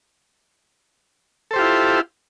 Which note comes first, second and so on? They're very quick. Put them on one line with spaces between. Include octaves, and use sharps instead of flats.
A4 C5 G4 F4 E4